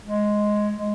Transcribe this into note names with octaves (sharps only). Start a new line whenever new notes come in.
G#3
G#3